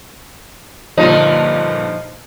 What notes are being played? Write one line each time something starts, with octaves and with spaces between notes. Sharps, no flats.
G2 A#2 D3 F3 D#4 D#5